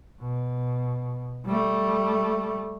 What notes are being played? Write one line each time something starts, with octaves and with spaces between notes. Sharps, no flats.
B2
G3 A3